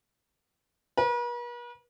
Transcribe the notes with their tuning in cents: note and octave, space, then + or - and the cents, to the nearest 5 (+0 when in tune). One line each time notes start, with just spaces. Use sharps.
B4 -45